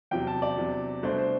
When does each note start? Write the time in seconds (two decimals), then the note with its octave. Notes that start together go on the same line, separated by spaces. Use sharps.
0.11 E2 C3 F#3 G5
0.27 A5
0.42 D5
0.57 E2 C3 F#3
1.03 C2 B2 A3 D4 C5
1.18 C5